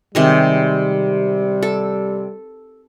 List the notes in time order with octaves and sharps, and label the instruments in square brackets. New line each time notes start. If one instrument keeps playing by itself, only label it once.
[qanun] C3 D#3 G#3 [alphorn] G3
[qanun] A4